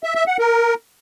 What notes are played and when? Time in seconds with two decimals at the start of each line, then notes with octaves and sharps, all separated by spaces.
0.03 E5
0.15 E5
0.27 F#5
0.39 A#4